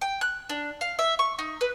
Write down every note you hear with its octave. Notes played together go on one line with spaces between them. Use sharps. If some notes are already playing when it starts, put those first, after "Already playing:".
G5
F#6
D4
F5
E5
C#6
D#4
B4